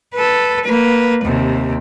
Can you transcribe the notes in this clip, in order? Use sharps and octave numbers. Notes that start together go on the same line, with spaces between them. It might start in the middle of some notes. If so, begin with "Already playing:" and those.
A4 B4
A#3 B4
D#2 C3